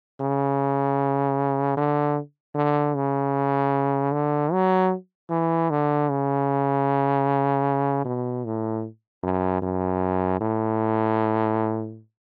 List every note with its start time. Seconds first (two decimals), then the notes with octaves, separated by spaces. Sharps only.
0.20 C#3
1.77 D3
2.55 D3
2.95 C#3
4.12 D3
4.52 F#3
5.30 E3
5.70 D3
6.09 C#3
8.05 B2
8.45 A2
9.23 F#2
9.62 F#2
10.41 A2